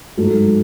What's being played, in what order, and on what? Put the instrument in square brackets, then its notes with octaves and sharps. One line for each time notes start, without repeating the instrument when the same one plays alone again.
[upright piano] G#2 F#3 A3